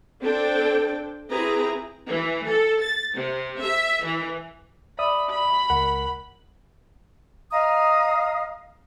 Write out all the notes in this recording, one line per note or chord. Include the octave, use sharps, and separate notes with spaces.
C4 D4 A4 G5
C4 E4 G4 G#4 B4 A#5
E3
A4
A6
C3
E5
E3
D5 E5 B5 D#6
B5
C#2 A#4 F#5
D#5 F5 A#5 D#6